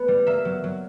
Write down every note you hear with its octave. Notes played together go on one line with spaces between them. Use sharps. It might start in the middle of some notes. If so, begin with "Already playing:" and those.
Already playing: A3 B3
G3
A#3 E5
F#3
F#3